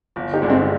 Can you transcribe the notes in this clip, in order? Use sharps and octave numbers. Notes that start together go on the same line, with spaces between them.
G1
D#4 G4
G2 D3 G#3
C4 D#4